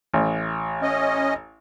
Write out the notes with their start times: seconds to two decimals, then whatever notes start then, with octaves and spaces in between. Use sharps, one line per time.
0.14 A1
0.82 C#4 D#5